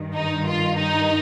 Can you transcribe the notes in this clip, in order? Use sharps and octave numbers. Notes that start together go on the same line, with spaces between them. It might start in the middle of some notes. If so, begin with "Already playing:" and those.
Already playing: G2 D#3
D#4
F4
D#4